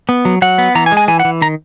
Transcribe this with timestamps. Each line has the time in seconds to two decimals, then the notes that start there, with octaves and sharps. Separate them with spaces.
0.09 B3
0.25 F#3
0.42 F#3 F#5
0.58 B3
0.75 E3 A#5
0.86 G#5
0.92 G#3
0.97 G#5
1.08 E3 G#5
1.20 F#5
1.25 E3
1.42 D#3 A#5